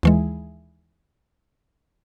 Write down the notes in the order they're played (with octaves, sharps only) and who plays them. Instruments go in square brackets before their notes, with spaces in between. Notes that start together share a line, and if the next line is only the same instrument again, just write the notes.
[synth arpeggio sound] D#2 E3 G#3